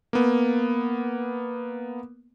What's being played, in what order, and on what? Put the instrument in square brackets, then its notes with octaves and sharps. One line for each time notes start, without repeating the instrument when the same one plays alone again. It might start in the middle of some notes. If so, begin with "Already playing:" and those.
[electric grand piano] A#3 B3